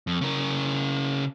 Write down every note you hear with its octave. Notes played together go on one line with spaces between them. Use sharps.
F2
C#3 A#4